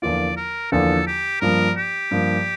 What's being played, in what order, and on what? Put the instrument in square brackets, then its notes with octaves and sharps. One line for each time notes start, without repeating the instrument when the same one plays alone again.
[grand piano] E2 D3 F3 A#3 F4 [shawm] D5
[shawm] A#4
[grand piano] E2 D3 F3 A#3 F4 [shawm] A4
[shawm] G4
[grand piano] G2 F3 A#3 [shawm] A#4
[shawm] G4
[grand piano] G2 F3 A#3